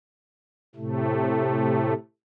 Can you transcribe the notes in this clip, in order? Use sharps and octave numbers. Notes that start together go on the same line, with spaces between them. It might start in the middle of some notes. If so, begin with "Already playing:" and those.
A2 C3 A3